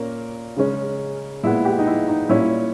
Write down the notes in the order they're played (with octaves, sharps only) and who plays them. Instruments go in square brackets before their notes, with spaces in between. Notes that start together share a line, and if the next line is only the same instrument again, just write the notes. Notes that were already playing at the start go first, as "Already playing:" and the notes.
Already playing: [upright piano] A#2 A#3 C#4 A#4
C#3 G#3 C#4
A#2 G#3 B3 E4
G4
D#4
E4
D#4
A#2 G3 C#4 E4